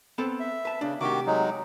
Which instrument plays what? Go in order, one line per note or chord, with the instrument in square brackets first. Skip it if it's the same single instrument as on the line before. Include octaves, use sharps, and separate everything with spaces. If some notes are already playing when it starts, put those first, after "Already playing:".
[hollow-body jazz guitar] B3 C4 A4
[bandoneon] E5
[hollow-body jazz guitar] B4 A5
[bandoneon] C#3 [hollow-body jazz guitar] D4
[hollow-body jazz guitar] C3 A3 G4 [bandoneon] D#3 F#4 D6
[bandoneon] F#3 G#3 D#4